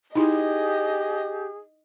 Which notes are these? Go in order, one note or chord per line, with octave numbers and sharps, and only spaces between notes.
D#4 E4 G4 G#4 D#5